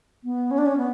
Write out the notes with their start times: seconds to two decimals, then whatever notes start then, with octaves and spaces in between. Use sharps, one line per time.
0.24 B3
0.51 C#4
0.58 D4
0.66 C#4
0.77 B3